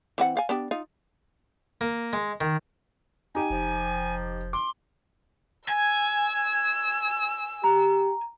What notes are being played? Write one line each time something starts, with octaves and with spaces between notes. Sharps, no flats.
E3 C4 F#5
F5 G#5
B3 D4 G4
D#4 F4
A#3
G#3
D#3
D#4 G4 G#5
F1 F3
C6 D6
G#5 E6
G4 A#5